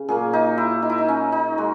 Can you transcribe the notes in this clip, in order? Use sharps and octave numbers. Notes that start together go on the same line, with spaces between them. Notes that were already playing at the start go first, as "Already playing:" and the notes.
Already playing: C#3
A#2 F#3 A#3 G#4
D#4
E4
D#4
E4
D#4
C#4
D#4
G#3 F#4